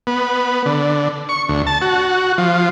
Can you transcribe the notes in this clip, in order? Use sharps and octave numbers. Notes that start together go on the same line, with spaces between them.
B3
D3
C#6
D2
A5
F#4
F3